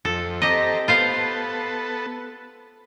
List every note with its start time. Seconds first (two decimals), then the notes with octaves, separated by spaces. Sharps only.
0.05 F2 A4
0.42 C4 G4 A4 D#5 A#5
0.88 B3 F4 A4 C5 F5